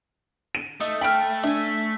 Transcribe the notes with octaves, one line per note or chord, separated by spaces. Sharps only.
D#7
A3 D#4
G5 B5 F6 D7
D4 E5 G#5